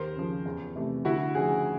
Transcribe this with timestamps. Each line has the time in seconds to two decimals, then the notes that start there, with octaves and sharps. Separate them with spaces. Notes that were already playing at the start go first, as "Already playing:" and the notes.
Already playing: D#2 A#4 C5
0.16 C#3 F3
0.45 E2
0.76 C3 E3 A3
1.05 D2 E4 F#4
1.35 C#3 F3 A3 F#4 G#4